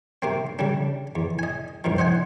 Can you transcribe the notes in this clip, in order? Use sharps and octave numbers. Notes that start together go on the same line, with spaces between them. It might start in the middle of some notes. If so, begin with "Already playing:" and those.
C3 A#3 C4
C#3 G3 D4
E2
D#5 G#5
C2 G2 A#2 F3
C5 D#5 F#5 G#5